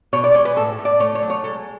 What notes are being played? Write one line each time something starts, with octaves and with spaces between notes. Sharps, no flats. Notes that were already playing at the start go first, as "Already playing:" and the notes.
B2 C#5
D5
G#3 C#5
B4
A2 A4
A2
D5
A3 C#5
C#5
F#3
C#5
G#3 A4